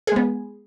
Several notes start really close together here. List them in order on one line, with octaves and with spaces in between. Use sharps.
G#4 G#3 B3